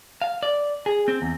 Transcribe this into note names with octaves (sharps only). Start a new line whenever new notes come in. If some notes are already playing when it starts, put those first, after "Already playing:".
F5
D5
G#4
C4
E2